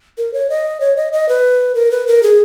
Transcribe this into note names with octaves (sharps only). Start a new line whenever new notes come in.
A#4
C#5
D#5
C#5
D#5
D#5
B4
A#4
B4
A#4
G#4